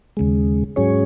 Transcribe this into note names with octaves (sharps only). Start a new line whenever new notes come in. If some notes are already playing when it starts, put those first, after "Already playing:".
D#2 C#3 G#3
G#2 F#3 C#4 G#4 C#5